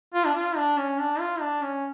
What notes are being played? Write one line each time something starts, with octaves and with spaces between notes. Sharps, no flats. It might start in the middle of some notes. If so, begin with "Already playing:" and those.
F4
D4
F4
D4
C#4
D4
F4
D4
C#4